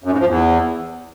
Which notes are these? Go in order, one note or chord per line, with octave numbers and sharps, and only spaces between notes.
F#2
G#2
F3
E2